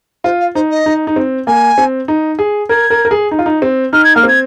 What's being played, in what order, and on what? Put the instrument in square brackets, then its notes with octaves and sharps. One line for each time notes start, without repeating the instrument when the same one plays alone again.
[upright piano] F4 [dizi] C5
[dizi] F5
[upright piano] D#4 [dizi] C5
[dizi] D#5
[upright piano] D#4
D#4
C4
[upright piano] A#3 [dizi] G#5
[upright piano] C4
D#4
G#4
[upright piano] A#4 [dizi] G#6
[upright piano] A#4
A#4
G#4
D#4
F4
D#4
C4
[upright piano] D#4 [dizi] F6
[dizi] G#6
[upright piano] A#3 [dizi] F6
[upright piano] C4 [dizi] G#6